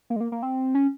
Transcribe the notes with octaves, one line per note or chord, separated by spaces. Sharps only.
A#3
G#3
A#3
A#3
C4
C#4